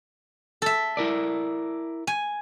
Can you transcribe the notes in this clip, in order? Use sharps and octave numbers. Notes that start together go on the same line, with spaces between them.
A4 E5
E4 A#4 D5
G#5